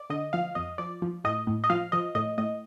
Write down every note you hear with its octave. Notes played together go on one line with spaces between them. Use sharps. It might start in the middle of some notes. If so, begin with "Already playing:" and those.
Already playing: D5
D3 D#5
F3 F5
F2 D#5
F3 D5
F3
A2 D#5
A2
D#5
F3 F5
F3 D#5
A2 D#5
A2 D#5